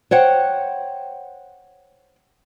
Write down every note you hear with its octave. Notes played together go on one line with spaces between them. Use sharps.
C5 C#5 F#5 G5